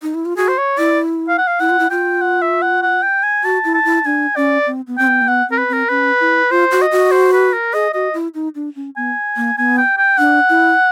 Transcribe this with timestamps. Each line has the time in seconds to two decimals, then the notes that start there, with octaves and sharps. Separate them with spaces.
0.02 D#4
0.14 E4
0.25 F4
0.37 F#4 G#4
0.48 C5
0.58 C#5
0.78 E4 D5
1.29 F5
1.38 F#5
1.47 F5
1.60 E4 F#5
1.70 F4
1.79 E4
1.90 F4 G5
2.22 F#5
2.42 E5
2.62 F#5
2.82 F#5
3.02 G5
3.23 G#5
3.44 F#4 A5
3.65 E4
3.74 A5
3.85 E4
4.05 D4 G#5
4.36 C#4 D5
4.67 C4
4.87 B3
4.98 C4 G5
5.07 B3
5.22 A#3
5.28 B3 F#5
5.49 C4 A#4
5.58 B4
5.69 C4 A#4
5.89 C#4 B4
6.20 E4
6.50 F4 C5
6.71 F#4
6.82 D#5
6.92 F#4
7.12 C5
7.33 B4
7.53 A#4
7.73 G#4 D#5
7.93 F#4 D#5
8.14 E4
8.34 D#4
8.55 D4
8.76 C#4
8.97 B3 G#5
9.36 A#3
9.58 B3 G#5
9.78 G5
9.98 G5
10.18 D4 F#5
10.49 E4